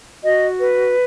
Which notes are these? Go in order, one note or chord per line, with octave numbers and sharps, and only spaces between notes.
F#4 D#5
B4